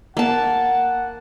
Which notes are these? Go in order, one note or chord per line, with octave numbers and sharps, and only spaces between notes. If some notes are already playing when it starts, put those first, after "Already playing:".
A#3 F#5 A5